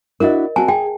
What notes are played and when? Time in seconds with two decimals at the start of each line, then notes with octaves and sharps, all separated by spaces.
0.20 D4 E4 F#4 A#4 D#5
0.56 C4 F#4 G#5 A5
0.68 G#4 G5